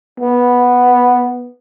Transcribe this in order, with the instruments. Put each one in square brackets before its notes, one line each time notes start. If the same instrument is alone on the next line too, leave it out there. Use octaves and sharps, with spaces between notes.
[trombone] B3